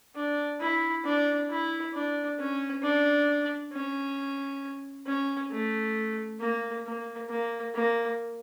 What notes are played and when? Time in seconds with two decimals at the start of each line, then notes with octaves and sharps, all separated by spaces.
0.15 D4
0.60 E4
1.05 D4
1.50 E4
1.94 D4
2.39 C#4
2.83 D4
3.73 C#4
5.07 C#4
5.51 A3
6.40 A#3
6.85 A#3
7.29 A#3
7.74 A#3